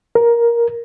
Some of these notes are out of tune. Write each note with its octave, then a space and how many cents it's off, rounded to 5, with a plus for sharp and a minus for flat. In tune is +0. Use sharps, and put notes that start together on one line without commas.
A#4 +10